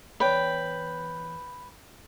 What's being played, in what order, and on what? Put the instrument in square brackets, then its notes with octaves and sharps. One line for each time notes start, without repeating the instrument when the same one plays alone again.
[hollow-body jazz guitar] E2 C#5 D5 [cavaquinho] B4 G5